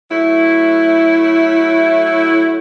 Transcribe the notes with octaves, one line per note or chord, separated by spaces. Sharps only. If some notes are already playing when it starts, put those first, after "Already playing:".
F#3 A3 E4